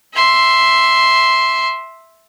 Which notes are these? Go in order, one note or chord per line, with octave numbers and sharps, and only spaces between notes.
E5 C6